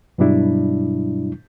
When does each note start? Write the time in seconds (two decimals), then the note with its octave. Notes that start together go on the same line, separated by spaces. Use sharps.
0.18 G2 B2 F#3 G3 D4 E4